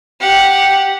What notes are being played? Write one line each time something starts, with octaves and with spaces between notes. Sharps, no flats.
G4 F#5